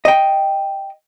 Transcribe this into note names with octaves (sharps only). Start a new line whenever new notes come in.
D#5 G5